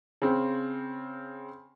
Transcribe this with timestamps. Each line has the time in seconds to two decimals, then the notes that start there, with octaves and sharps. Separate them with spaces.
0.22 C#3 C4